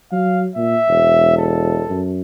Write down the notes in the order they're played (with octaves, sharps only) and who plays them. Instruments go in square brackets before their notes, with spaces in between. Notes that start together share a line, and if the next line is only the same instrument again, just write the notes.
[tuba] F#3 [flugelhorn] F5
[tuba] A#2 [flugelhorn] E5
[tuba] E1
[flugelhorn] A4
[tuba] F#2